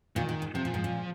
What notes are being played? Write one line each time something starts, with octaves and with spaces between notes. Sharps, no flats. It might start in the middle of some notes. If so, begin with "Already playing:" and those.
A#2 D#3
A#2
G#2
C3 F3
A#2
G#2
A#2